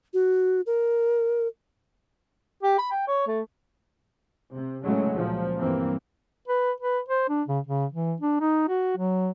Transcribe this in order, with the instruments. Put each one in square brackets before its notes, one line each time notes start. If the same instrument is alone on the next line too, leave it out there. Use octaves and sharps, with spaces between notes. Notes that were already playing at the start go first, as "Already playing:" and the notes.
[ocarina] F#4
A#4
[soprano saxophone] G4
B5
G5
C#5
A3
[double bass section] C3
A2 C#3 F#3 G#3 A3
C#2 A#2 F3
G2 E3 A#3 C4
[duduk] B4
B4
C5
D4
C#3
C#3
E3
D4
D#4
F#4
F#3